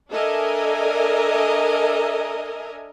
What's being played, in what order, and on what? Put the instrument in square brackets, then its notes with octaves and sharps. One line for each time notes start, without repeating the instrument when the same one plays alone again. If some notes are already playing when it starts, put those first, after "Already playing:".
[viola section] D4 A4 A#4 D#5 E5 G#5